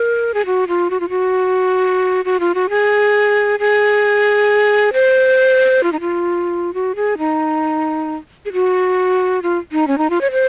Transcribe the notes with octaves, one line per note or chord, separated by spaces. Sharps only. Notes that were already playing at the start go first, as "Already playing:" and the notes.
Already playing: A#4
G#4
F#4
F4
F#4
F4
F#4
F#4
F4
F#4
G#4
G#4
C5
F4
D#4
F4
F#4
G#4
D#4
G#4
F#4
F4
D#4
C#4
D#4
F4
C#5
C5